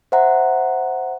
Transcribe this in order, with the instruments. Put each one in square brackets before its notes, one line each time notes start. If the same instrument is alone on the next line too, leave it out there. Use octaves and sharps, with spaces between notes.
[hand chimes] C5 E5 F#5 A#5